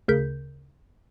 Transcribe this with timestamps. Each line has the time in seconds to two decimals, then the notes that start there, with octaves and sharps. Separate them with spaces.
0.08 D2 C#3 A#4 G6 B6